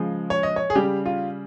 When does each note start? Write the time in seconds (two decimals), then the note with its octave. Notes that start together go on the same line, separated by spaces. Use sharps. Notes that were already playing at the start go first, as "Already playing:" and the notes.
Already playing: C#3 F3 G#3
0.30 C#5
0.43 D#5
0.56 C#5
0.70 G#4
0.75 C#3 G3 G4
1.06 F4